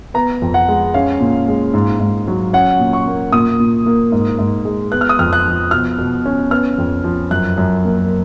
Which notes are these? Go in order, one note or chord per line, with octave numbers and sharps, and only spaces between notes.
B3 A#5
F2
F#5
G#3
C#4 F5
A#2
G#3
G#2
G#2
F#3
C#4 F#5
A#2
C#6
A#3
A#2 D#6
A#2
A#3
G#2
G#2
G#3
B3 F#6
F6
D#6
F2 F6
F#6
F3
B2 F6
B2
C#4
B3 F6
F2
F3
F#2 F#6
F#2
A#3